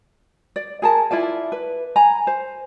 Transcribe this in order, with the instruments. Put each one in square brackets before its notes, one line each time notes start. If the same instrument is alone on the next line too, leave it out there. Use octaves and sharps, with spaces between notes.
[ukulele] D5
G#4 A#4 A5
E4 F4 D5 A5
B4
G#5 A#5 B5
C5